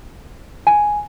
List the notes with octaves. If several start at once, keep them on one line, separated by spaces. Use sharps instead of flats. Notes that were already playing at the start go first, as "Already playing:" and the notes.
G#5